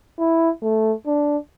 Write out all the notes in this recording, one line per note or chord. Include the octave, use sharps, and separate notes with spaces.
E4
A3
D4